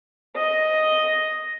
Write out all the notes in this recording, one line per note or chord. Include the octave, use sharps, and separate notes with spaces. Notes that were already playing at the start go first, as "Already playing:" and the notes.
D#5